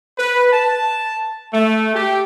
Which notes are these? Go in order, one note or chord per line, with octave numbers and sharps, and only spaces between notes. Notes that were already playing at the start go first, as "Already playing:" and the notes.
B4
A5
A3
G4